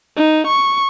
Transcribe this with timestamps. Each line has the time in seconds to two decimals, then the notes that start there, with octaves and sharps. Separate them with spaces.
0.17 D#4
0.47 C#6